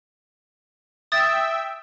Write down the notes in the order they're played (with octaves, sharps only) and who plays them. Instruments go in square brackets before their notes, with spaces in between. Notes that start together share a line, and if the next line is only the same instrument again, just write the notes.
[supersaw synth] E5 G5 E6 [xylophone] D#6 A6